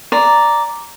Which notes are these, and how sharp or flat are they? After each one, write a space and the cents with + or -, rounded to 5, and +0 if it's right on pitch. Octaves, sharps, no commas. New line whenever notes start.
D5 -5 A#5 +0